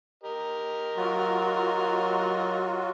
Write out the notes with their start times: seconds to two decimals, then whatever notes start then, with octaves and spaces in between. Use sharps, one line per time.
0.24 G4 A#4 D#5
0.97 F#3 F4 F#4